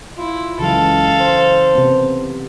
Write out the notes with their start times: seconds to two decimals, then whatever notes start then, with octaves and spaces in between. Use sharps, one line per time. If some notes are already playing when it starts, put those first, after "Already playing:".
0.17 E4 F4
0.59 C#2 C#3 E3 F#3 A4 F5
1.20 C5
1.75 C3 B3